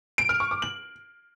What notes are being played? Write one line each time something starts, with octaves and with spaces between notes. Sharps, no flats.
D7
F6
C#6
D6
F#7